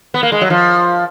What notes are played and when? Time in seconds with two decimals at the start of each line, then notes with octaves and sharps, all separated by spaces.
0.14 B3
0.23 A#3
0.32 G#3
0.41 F#3
0.50 F3